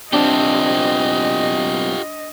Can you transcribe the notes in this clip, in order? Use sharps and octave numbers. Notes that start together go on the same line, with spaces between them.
B1 C4 D4 F4 G4 D#5